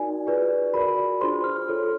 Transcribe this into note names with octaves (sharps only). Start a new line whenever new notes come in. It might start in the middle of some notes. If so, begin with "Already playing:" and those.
Already playing: D#4 F#4 A#4 D5 G#5
F4 G#4 B4 D5
F#4 A#4 D5 B5
D4 F4 G#4 C5 C6
F6
F4 A4 C#5